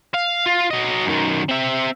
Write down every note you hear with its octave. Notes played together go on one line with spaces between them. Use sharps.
F5
F4
F#3 D#5
F#2 D#3
C4 E5